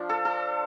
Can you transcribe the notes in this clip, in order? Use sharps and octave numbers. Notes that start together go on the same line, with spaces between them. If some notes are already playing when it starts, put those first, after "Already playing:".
Already playing: F3 D4 F4
A4
A4